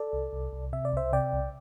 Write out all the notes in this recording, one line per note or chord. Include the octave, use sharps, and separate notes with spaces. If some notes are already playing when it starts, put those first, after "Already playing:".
Already playing: A4 D5
C2
C2
C2
C3 E5
D5
C2 C5 E5
C3 D5 G5
C2